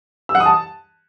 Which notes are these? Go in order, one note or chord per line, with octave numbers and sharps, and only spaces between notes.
E6
F#5
D#6
A5